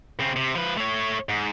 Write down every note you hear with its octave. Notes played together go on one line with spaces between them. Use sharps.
C#3 C4
C3
F3 B4
A3 C#5
G#2